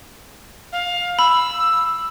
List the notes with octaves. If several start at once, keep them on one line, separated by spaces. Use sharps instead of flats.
F5
B5 E6